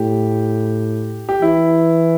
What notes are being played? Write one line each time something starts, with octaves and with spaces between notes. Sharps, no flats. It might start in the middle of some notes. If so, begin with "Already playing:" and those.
Already playing: A2 G4
G4
E3 E4